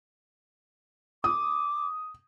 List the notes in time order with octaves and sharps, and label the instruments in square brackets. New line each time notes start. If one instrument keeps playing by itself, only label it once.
[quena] D6 [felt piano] D#6